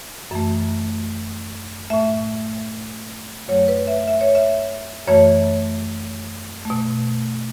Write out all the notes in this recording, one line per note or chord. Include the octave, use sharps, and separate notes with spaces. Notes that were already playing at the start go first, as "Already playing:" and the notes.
F#2 E3 A3
A2 A3 E5
F#2 F#3 A3 C#5
B4
E5
E5
C#5
E5
F#2 E3 A3 C#5
B2 A3